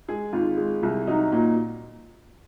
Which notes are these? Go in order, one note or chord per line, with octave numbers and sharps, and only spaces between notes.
G#3 G#4
G#1 F4
G#3
C2
F#3 D#4
A#2